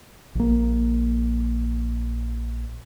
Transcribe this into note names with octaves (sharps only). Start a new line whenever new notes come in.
A#1 A#3